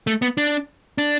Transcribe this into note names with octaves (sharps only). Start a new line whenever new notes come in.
A3
B3
D4
D4